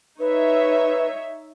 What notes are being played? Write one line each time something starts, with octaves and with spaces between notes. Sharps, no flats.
D#4 B4 C#5 E5